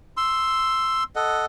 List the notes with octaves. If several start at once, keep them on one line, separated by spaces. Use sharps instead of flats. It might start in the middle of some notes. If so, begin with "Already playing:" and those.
C6 E6
A4 D#5 F#5